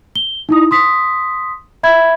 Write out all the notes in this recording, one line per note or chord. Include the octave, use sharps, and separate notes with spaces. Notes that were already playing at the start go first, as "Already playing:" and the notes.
G7
D#4 E4 D#6
C6 D#6 B6
E5 B5 G#6